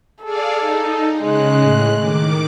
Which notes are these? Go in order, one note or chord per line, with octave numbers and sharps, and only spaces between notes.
G#4 A4 D5 F5
D#4
C#3 G#3 F#6
A2 F#6
D#3 D6